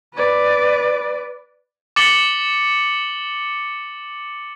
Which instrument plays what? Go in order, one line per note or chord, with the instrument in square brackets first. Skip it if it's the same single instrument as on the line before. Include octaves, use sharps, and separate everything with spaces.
[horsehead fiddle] B4 D5
[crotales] D6 A6 C#7 F#7 G7